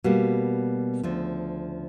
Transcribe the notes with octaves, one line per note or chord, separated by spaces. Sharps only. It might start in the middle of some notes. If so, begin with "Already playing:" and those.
B2 G3 A#3
D2 C#3 F3